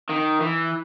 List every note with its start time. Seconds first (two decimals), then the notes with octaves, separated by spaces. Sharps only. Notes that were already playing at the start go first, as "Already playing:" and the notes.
0.09 D#3
0.41 E3